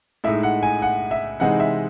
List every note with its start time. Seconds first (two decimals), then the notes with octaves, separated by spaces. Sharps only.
0.24 A2 G#3 D#4 E5
0.43 F#5
0.63 G#5
0.82 F#5
1.11 E5
1.40 C3 E3 G#3 C4 D#4 F#5
1.60 E5